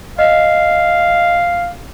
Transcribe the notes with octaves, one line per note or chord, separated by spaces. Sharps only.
D#5 F5